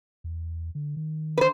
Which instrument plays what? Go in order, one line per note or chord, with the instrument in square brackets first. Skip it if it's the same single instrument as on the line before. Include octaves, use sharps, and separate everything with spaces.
[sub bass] E2
D3
D#3
[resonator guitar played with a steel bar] B4 C5